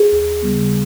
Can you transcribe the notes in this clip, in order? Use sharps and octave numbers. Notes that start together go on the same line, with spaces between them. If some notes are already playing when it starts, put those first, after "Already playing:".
Already playing: G#4
D#2
C#3 G3 B3